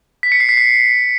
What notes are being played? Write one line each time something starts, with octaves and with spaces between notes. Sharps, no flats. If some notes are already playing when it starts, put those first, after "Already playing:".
B6
C#7
C7
B6
C7